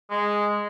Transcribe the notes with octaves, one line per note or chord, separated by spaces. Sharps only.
G#3